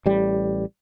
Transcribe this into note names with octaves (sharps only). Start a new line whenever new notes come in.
A1 G3